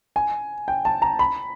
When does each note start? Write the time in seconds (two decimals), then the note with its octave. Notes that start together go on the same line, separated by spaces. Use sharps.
0.16 G#5
0.68 G5
0.85 A5
1.02 A#5
1.19 B5